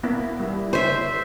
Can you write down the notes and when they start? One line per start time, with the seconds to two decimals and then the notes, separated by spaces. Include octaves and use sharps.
0.03 A#3 B3 E4
0.40 G3 E4
0.73 C5 C#5 E5